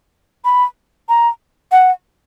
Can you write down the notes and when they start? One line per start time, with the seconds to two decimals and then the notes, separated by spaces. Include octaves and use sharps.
0.45 B5
1.09 A#5
1.72 F#5